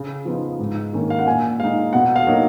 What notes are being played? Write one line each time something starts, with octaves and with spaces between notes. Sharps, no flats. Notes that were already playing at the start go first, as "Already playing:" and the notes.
Already playing: C#3
F3 B3 D#4
G#2
D#3 A#3 C#4
F5
F#5
A#2 G#5
G#3 D#4 F5
B2 F#5
F5
F#3 A#3 D#4